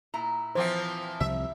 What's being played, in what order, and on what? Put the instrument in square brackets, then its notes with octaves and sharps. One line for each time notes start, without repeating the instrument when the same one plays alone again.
[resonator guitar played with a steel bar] A#2 E4 A#5
[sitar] E3 F3 C4 [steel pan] C5
[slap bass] C2 C3 F3 [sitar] E5